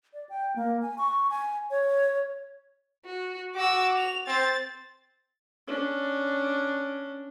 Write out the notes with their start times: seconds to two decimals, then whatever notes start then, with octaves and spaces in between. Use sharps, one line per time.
0.14 D5
0.29 G5
0.56 A#3
0.82 G#5
0.98 C#6
1.30 G#5
1.70 C#5
3.05 F#4
3.55 F#4 D6 E6
3.98 F7
4.27 C4 A6
5.67 C#4 D4